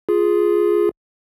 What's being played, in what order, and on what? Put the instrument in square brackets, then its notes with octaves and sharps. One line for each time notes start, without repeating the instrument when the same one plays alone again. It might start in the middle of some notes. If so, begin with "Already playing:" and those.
[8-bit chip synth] F4 G#4